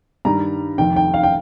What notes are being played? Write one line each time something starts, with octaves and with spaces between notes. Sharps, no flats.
G2 D#3 G3 A#5
F1 F2 D#3 G5
G5
F5
G5